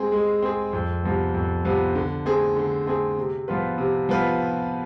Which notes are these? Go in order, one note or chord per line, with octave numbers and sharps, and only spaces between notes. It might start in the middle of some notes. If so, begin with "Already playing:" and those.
Already playing: G#3 C4 G#4
G#3
C4 G#4
F2
C3 F3 B3
F2
C3 F3 B3
D3
A3 C4 G#4
D3
A3 C4 G#4
C3
F3 B3 F4 B4
C3
F3 B3 F4 B4